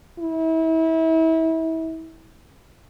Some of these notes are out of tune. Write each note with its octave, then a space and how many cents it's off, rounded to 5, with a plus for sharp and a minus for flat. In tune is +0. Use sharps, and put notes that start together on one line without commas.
E4 -30